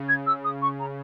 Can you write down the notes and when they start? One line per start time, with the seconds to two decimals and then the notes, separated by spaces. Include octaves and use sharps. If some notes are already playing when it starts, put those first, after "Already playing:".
Already playing: C#3
0.09 G#6
0.26 E6
0.44 D#6
0.62 C#6
0.79 A#5